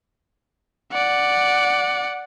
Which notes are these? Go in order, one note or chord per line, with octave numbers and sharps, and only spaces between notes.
D5 F#5